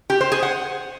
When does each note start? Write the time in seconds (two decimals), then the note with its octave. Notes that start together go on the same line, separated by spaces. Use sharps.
0.10 G4
0.21 C5
0.32 G#4
0.43 F#5